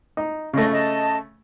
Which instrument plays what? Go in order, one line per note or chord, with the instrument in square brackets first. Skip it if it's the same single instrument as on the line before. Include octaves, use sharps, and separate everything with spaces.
[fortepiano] D#4
[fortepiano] C#3 A3 [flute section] D#5
[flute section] D#5 A5